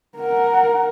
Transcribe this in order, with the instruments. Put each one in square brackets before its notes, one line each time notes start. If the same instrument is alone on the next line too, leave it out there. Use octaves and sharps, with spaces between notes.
[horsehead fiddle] A#4 F#5